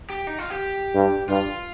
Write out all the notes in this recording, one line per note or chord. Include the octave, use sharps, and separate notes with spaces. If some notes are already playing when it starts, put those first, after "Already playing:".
G4
D#4
F4
G4
G2
G2 F4